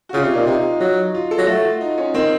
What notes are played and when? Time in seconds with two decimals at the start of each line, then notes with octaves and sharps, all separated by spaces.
0.09 F#4
0.14 C#3 F4
0.24 C3
0.31 A#2 D#4
0.46 C3 D#4
0.80 F#3
1.14 F4
1.31 A4
1.38 F#3
1.47 A3 F#4
1.64 F4
1.81 D#4
1.98 C#4
2.15 D#3 C4